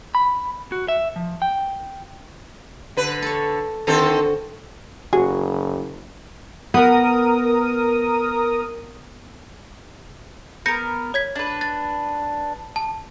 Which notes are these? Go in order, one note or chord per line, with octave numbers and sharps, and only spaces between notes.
B5
F#4
E5
F3
G5
D3 B4
A4 C#5
D3 D#3 C4 F#4 A4
F#1 F#4 G#4
B3 A#4 D#6
B3 A#4 G6 A#6 C#7
C#5 G#6 B6
D4 B4
A6
A5